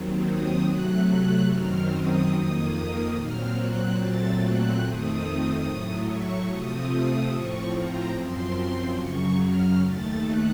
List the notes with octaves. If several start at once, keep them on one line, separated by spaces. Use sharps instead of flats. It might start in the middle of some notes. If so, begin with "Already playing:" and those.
Already playing: D#2 D#3 F#3 C4
D#6
C3 F#3 A3 F#6
F#6
F#2 D#3 F#3 C4 F6
D#6
F2 D#3 A#3 D#6
A#2 F#3 C4 F6
F#6
A#2 F#3 A3 C4 A6
F#6
F2 D#3 A3 C4 D#6
A2 F#3 A3
C#6
C3 F3 A3 C4 D#6
D#6
A2 F3 C4 C#6
A#5
F#2 F3 C4 C6
F#2 C#3 F#3 C#6
F6
D#2 D#3 A3 A6
F#6